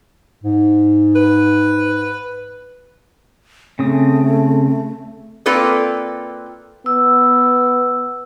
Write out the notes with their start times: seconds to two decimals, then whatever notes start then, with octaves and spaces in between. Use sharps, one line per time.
0.44 G#2
1.16 B4
3.79 C#3 A3 C4 D#6
5.46 A#3 C4 F4 A4 B4 D5
6.86 B3 E6